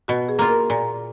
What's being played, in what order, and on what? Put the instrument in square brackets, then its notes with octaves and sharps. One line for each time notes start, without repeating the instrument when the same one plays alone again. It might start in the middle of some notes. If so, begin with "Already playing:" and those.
[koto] B2 [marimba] F#4
[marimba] G#4
[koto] A#3 F4
[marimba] A#4
[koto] A#2